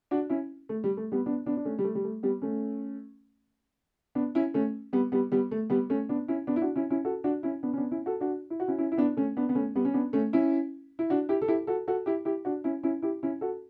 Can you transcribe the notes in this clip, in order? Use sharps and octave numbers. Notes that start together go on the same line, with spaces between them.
D4 F#4
C#4 E4
A3
G3
A3
G3 B3
B3 D4
B3 D4
D4
A3 C#4
G3
A3
G3
A3
G3 B3
A3 C#4
B3 D4
C#4 E4
A3 C#4
G3 B3
G3 B3
G3 B3
A3
G3 B3
A3 C#4
B3 D4
C#4 E4
B3 D4
E4
D4 F#4
C#4 E4
C#4 E4
F#4 A4
D4 F#4
C#4 E4
B3 D4
C#4
B3 D4
C#4 E4
F#4 A4
D4 F#4
E4
F#4
C#4 E4
C#4 E4
E4
B3 D4
A3 C#4
B3 D4
B3
A3 C#4
G3 B3
C#4
B3 D4
A3 C#4
C#4 E4
E4
D4 F#4
E4 G4
A4
E4 G4
F#4 A4
F#4 A4
E4 G4
E4 G4
D4 F#4
C#4 E4
C#4 E4
E4 G4
C#4 E4
F#4 A4